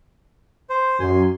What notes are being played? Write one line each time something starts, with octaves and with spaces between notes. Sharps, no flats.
C5
F#2 G#5 C6